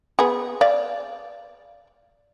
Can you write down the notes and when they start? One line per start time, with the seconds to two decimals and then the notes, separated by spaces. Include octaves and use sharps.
0.19 B3 G#4
0.61 D5 F5